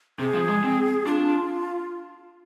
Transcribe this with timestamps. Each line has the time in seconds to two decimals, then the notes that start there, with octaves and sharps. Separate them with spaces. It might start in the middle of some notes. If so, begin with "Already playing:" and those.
0.19 C3 G#4
0.34 F3
0.49 G#3
0.64 C4
1.06 D4 F4